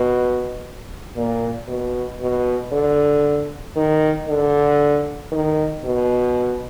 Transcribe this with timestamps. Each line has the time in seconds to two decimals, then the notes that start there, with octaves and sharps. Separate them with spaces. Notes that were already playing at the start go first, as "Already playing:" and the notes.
Already playing: B2
1.16 A#2
1.68 B2
2.20 B2
2.72 D3
3.76 D#3
4.28 D3
5.32 D#3
5.84 B2